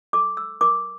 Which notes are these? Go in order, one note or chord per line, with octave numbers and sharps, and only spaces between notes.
A4 D6
E6
A#4 D6